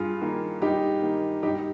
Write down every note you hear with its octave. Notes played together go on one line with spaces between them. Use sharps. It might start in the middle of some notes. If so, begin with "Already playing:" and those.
Already playing: G2 F4 G#4
D#3 A#3
G2 D#4 G4
D#3 A#3
G2 D#4 G4